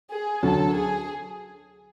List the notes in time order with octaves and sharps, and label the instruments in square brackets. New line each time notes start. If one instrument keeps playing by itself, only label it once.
[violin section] G#4
[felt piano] D2 D3 F#3 [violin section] A4
[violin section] G#4